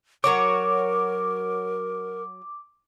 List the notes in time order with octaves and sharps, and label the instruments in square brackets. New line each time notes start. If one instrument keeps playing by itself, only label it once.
[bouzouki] F#3 F#4 C#5 [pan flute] A#4 [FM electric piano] D6